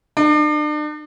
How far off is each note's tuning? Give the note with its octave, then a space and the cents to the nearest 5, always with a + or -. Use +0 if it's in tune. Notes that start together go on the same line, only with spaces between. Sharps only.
D4 +40